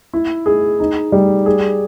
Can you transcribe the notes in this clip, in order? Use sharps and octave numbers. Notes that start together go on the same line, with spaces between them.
E4
G#4
D#4
G3
G#4